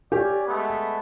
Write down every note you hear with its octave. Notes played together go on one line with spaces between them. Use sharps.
C#4 G4 D5 G#5
G#3 A3 B3